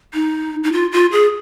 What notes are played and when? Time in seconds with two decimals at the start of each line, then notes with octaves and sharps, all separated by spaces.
0.14 D#4
0.64 D#4
0.72 F4
0.92 F4
1.12 G#4